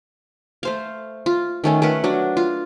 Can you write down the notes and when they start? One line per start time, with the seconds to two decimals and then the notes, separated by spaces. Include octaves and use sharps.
0.63 A3 C5 F5
1.26 F4
1.64 D#3 A3 C#4
1.82 A3 A#4 B4 F#5
2.04 F#3 D4
2.37 F4